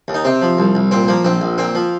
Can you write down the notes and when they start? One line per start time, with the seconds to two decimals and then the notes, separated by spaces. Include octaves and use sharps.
0.08 D#2
0.14 D#4
0.25 C3 C4
0.42 F3
0.58 C2
0.75 C2
0.91 A#2 C4
1.08 F3 A#3
1.25 A#1 C4
1.41 A#1
1.58 A#2 C4
1.75 F3